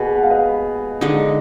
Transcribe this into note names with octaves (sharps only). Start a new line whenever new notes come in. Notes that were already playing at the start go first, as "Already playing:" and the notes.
Already playing: B2 A#3 G#4 B4
F#5
F5
B4 D#5
D3 G#3 D#4